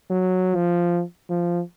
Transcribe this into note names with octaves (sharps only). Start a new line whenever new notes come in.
F#3
F3
F3